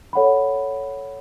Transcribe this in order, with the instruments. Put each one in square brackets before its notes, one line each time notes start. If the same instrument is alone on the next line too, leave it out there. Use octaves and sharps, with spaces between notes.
[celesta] A4 C#5 F#5 B5